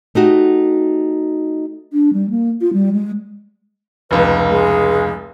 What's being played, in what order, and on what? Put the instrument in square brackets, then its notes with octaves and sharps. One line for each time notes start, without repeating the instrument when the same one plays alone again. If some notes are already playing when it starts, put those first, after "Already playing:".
[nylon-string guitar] A3 D#4 F#4 G4
[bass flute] D4
G3
A#3
F4
G3
G#3
[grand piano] F1 C#2 [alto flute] B4
[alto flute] G#3